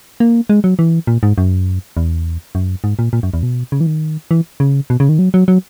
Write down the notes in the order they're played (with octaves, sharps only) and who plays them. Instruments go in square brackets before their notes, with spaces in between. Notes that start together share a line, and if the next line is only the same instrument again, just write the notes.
[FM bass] A#3
G#3
F#3
E3
A#2
G#2
F#2
E2
F#2
G#2
A#2
A#2
F#2
E2
B2
C#3
E3
D#3
E3
C#3
B2
C#3
D#3
F#3
F#3
F#3